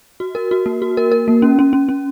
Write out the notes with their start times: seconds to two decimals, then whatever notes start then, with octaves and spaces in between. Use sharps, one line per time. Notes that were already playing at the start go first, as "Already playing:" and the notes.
0.20 F#4
0.35 A#4
0.51 F#4
0.66 A#3
0.82 F#4
0.97 A#4
1.12 A#4
1.28 A#3
1.42 C#4
1.59 C#4
1.73 C#4
1.89 C#4